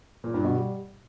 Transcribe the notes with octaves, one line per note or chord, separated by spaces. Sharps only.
A#2
G2
B2
G3